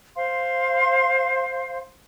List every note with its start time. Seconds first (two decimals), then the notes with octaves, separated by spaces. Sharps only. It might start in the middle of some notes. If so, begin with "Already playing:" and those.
0.15 C5 F5 C6